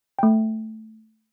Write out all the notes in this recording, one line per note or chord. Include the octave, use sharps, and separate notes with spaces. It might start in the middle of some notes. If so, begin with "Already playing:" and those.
A3 G5